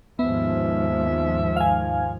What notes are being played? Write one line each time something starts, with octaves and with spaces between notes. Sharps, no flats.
D#2 G#2 F3 B3 E5
F5 G#5